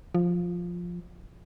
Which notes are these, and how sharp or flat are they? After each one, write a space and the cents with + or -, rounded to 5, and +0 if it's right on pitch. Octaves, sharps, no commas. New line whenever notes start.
F3 +5